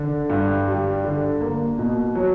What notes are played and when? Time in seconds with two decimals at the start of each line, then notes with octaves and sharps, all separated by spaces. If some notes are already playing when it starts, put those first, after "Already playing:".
Already playing: D3
0.30 G2
0.67 G3
1.05 D3
1.41 A#3
1.79 B2
2.15 F#3